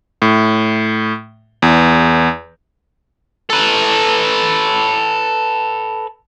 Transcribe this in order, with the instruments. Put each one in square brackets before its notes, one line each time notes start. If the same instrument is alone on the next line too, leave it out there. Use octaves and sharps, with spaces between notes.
[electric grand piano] A2
E2
[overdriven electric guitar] A4 B4